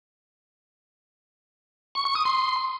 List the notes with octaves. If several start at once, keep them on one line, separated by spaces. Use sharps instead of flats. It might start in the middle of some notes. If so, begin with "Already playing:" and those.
C#6
C#6
D#6
C6